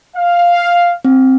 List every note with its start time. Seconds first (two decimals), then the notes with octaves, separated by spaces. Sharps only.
0.16 F5
1.05 C4